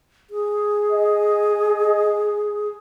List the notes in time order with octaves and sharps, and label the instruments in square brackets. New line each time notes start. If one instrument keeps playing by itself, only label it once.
[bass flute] G#4
[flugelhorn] D#5